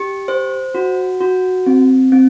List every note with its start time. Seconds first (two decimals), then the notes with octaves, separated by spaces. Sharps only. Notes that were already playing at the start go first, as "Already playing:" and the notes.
Already playing: G4
0.28 C5
0.75 F#4
1.21 F#4
1.66 C4
2.12 C4